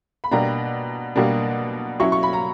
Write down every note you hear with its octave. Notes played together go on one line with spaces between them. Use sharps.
B5
B2 G3 A#3 D4 A#5
B2 G3 A#3 D4
F#3 C#4 E4 C#6
C#6
B5
A#5